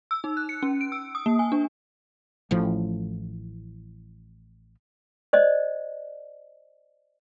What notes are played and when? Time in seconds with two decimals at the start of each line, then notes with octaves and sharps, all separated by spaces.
0.11 E6
0.24 D#4
0.37 F#6
0.49 C#7
0.63 C#4
0.81 D7
0.92 E6
1.15 D#6
1.26 A#3
1.39 G#5
1.52 D4
2.51 A1 A2 F3
5.33 C5 D5 D#5